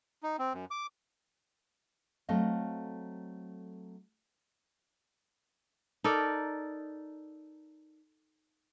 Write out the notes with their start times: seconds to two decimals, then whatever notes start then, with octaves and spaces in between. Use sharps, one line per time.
0.23 D#4
0.39 C4
0.53 F#2
0.71 D6
2.29 F#3 A3 C4 D#5 F5
6.04 D#4 A4 A#4 D5